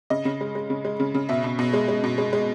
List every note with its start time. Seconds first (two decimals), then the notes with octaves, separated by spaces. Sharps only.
0.10 C#3 D#5
0.25 C#3
0.41 G#3
0.55 G#3
0.70 C#3
0.85 G#3
1.00 C#3
1.14 C#3
1.29 B2 E5
1.44 B2
1.59 B2
1.73 G#3
1.88 G#3
2.04 B2
2.18 G#3
2.33 G#3